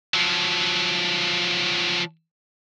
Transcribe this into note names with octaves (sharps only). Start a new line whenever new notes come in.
F3 F#3